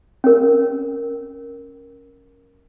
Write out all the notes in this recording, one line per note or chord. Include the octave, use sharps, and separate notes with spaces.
C#4 A#4